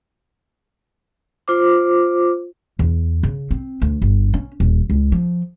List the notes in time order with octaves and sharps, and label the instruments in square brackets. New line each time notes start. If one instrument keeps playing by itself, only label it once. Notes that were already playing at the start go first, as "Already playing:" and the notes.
[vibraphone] F4 C5 D6
[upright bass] E2
C#3
C4
D2
G1
C#4
D#1
C#2
F3